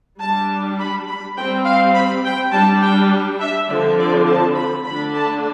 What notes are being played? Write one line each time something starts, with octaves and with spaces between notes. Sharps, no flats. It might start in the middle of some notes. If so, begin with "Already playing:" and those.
G3 D4 A5
B5
B5
G3 C4 G5
F5
B5
G5
G3 D4 A5
G5
E5
D3 F3 C4 D5
D5
A5
B5
D3 A3 D4 B5
A5